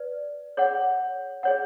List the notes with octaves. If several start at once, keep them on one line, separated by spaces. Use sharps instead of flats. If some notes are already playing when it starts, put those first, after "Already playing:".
Already playing: B4 D5
G#4 C#5 F#5
G#4 C#5 F#5